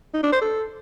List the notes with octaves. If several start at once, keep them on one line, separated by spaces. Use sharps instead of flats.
D#4
D4
C5
A4